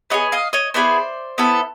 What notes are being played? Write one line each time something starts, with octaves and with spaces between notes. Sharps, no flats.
B3 E4 G#4 C#5 D#5
D#5 F5
C#5 D#5
B3 E4 G#4 C5 D5
B3 E4 A4